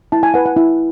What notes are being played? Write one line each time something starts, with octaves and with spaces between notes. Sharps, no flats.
E4 A5
G#5
B4 F#5
F#5
E4